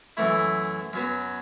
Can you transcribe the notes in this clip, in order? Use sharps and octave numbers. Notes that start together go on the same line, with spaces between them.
F#2 E3 A3 E4
F#2 F#3 B3